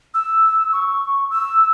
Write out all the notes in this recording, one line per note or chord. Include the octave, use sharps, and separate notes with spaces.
E6
C#6
E6